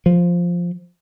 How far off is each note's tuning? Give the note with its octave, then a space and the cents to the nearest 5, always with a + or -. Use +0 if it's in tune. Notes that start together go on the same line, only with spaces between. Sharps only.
F3 +0